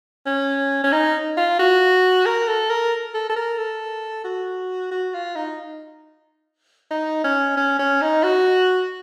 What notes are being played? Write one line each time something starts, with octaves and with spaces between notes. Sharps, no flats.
C#4
C#4
D#4
F4
F#4
A#4
A4
A#4
A4
A4
A#4
A4
F#4
F#4
F4
D#4
D#4
C#4
C#4
C#4
D#4
F#4